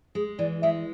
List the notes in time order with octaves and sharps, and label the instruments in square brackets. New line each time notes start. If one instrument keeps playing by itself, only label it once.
[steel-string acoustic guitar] G#3 [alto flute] G#4
[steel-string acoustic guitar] E3 [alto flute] D5
[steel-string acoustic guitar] G#3 [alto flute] E5